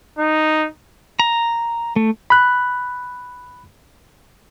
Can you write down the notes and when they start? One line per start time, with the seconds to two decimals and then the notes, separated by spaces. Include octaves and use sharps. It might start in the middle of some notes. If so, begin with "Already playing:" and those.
0.19 D#4
1.19 A#5
1.96 A3
2.30 B5 F#6